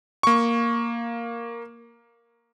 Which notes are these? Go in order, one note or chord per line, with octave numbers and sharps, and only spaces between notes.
A#3 C#6